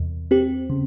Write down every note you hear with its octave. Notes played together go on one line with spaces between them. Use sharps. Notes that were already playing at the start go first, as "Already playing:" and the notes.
Already playing: E2 C3
C4 G4
C#3